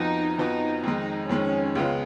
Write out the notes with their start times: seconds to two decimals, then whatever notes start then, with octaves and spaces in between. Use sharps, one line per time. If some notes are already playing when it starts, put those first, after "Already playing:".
Already playing: F2 F3 B3 D#4 F#4
0.38 F2 F3 B3 D#4 F#4
0.84 F2 D#3 G#3 D#4
1.29 F2 D#3 G#3 C#4
1.75 C#2 C#3 G#3 B3 F4